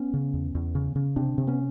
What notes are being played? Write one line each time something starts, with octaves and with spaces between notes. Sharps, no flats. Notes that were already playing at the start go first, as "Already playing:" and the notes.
Already playing: B3 C#4
C#3
E2
E2
C#3
C#3
C3 C4 D4
C3
B3 C#4